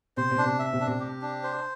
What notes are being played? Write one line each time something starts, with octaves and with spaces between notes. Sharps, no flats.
C3 C5
C3
D4
C3
E5
C3
D4
C3
G4
D4
C5